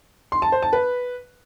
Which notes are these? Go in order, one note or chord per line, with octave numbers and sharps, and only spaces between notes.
C6
A5
C5
A5
B4